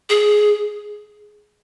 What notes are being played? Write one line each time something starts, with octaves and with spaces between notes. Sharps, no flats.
G#4